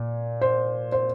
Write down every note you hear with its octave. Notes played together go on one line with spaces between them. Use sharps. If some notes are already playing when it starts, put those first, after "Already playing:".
Already playing: A#2
C5
C5